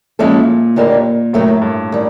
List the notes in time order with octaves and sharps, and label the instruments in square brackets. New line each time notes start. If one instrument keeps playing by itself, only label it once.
[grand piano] A#2 [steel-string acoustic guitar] F3 G#3 C#4 E4 A4
[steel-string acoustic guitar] D#2 D3 G3 A#3
[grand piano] A2 [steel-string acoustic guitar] C3 D#3 F#3 A3
[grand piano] G2
[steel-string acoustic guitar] D#3 G3